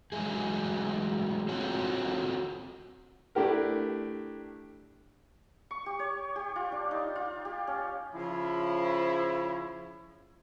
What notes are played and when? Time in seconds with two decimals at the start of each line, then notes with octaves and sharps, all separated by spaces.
0.12 E3 F#3 G#3 A3 G#4
1.49 C4 F4 F#4 A4 C5 C#5
3.35 A3 D4 E4 G4 A#4
5.71 C#6
5.86 G4
5.99 C#5
6.36 G4
6.56 F4
6.72 D4
6.91 D#4
7.16 F4
7.45 G4
7.67 C#4
8.15 C#3 F3 E4